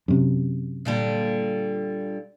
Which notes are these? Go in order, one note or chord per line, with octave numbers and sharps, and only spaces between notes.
F#2 C3
A#2 D3 G3